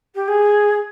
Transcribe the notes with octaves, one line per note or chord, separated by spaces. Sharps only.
G4
G#4